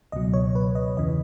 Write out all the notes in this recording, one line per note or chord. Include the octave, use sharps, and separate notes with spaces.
C#2 B2 F#3 D#5
C#5
B4
D#5
E2 C#3 E3 D#5